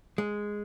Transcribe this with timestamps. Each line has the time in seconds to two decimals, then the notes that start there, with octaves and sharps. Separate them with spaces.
0.18 G#3